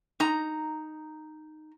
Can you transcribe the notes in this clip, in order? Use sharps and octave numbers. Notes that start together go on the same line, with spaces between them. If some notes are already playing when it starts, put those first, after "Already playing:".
D#4 A#5